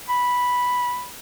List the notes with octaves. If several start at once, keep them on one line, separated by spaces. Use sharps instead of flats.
B5